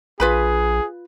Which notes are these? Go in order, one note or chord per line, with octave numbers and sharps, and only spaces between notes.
A#1 F4 G#4 B4 B5